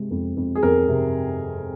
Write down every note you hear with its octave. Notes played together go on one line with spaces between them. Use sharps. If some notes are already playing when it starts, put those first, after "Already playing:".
Already playing: C3 G#3
F2
F2
G#4
F2 A#4
C3